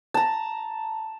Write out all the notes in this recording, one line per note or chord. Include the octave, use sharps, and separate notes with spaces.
A5 A#5